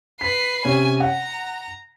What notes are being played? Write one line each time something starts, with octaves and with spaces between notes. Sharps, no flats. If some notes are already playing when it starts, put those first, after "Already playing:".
B4 B6 C7
C3 C#4 G#5
F#5 A#5